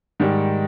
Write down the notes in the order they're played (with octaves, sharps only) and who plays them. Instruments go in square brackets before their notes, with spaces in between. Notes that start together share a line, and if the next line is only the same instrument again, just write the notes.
[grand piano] G#2 D#3 G3